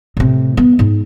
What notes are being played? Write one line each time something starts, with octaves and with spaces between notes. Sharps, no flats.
A2 C3
B3
G#2